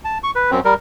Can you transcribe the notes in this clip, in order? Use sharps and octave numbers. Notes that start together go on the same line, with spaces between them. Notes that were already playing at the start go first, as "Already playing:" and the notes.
A5
C#6
B4
F#2 C4
G3 A#4